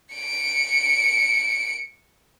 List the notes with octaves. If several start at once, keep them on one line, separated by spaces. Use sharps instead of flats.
C#7 D7